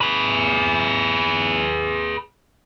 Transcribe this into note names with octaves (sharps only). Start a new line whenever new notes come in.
G#4 B4